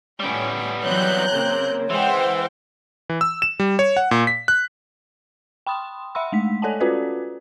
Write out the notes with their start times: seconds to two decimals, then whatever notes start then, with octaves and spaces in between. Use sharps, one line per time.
0.20 A2 G3 B3 C#4 G5
0.83 E3 F#3 C4 C#5 A#5 F#6 G6
1.33 C#3 A#3 C4
1.90 E3 G#3 C5 F#5 G5
3.09 E3
3.21 E6
3.42 E7
3.60 G3
3.79 C#5
3.97 F#5
4.11 A#2
4.27 B6
4.48 F#6
5.67 G5 B5 C6 D#6
6.15 E5 F#5 B5 C6 E6
6.32 G#3 A3 B6
6.62 A4 C#5 D5 F#5 G#5 A5
6.80 C#4 F4 F#4 A4 B4 D5